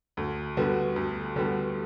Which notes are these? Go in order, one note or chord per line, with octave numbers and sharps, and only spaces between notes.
D2
D3 G3 B3 F#4
D2
D3 G3 B3 F#4